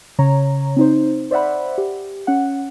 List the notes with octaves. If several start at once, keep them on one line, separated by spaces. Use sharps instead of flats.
C#3 C#5 A#5
C4 D#4 C5
C5 D5 E5 F#5 B5
G4
C#4 F#5